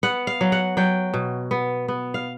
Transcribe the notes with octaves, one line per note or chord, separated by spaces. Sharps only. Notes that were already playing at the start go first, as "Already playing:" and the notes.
B3 F#5
F5
F#3
F#5
F#3 G5
B2
B3
B3
F5